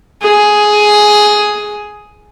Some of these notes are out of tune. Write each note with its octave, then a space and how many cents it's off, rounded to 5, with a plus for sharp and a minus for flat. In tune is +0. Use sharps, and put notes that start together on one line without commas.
G#4 +10